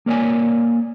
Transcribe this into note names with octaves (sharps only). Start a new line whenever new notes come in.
A#3 A#4 C#5 D5 G#5